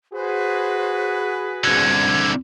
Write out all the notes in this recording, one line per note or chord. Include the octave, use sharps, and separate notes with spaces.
F#4 G#4 B4 C5
C2 D3 G#6